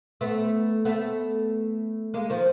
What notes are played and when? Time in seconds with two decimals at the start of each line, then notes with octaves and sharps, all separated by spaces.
0.21 A3 B3
0.85 A3 B3
2.14 G#3 A#3
2.30 D#3 F3